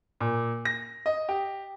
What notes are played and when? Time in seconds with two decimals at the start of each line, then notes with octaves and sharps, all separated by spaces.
0.20 A#2
0.65 A#6
1.06 D#5
1.29 G4